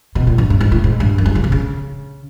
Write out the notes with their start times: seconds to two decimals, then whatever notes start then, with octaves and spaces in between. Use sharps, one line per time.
0.15 B2
0.27 A#2
0.38 G2
0.50 G2
0.61 G#2
0.72 A2
0.84 G#2
1.00 G2
1.18 F#2
1.26 G2
1.35 C#3
1.44 C3
1.52 C#3